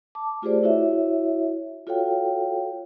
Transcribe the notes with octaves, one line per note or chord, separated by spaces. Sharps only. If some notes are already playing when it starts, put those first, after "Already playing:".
A5 D6
A3 F4 G4 G#4 C5 D5
E4 F#4 C#5 E5
F4 F#4 A4 C#5 F5 G5